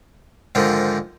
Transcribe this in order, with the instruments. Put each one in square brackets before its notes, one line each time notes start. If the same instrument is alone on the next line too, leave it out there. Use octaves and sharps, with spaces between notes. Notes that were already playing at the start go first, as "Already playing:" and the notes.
[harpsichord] G#2 D3 D#3 F3